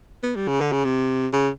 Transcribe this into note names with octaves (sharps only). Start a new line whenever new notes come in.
B3
G3
C#3
D3
C#3
C3
C#3